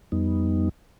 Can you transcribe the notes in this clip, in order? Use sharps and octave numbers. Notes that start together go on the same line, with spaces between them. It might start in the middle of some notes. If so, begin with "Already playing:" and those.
F2 G3 B3 D#4